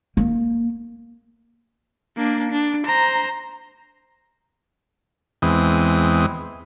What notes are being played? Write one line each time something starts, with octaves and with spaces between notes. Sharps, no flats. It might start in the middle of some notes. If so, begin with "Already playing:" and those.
A#3
A#3 D4
D4
C5 A#5
E2 E3 G#3 C4 D#6